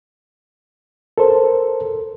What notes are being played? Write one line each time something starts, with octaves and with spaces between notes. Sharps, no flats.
A4 A#4 C5